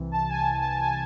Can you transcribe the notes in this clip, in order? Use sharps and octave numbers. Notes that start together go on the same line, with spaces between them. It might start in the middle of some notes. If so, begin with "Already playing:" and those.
Already playing: C2 C3 E3
A5
G#5
A5
A5
G#5